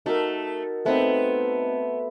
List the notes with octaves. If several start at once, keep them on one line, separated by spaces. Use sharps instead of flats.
A3 D#4 F#4 A#4
A3 B3 C4 D#4